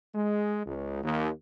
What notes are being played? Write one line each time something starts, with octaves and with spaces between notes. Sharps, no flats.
G#3
C#2
D#2